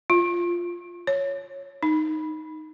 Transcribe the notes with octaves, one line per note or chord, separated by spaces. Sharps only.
F4
C#5
D#4